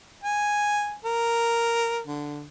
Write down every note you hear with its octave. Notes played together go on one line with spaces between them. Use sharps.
G#5
A#4
D3